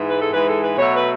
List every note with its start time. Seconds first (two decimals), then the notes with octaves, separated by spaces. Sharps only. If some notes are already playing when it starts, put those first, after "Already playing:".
Already playing: G#2 E3 G#3
0.09 B4
0.21 A4
0.32 G#2 E3 G#3 B4
0.48 A4
0.63 B4
0.78 B2 F#3 A3 C#5
0.94 B4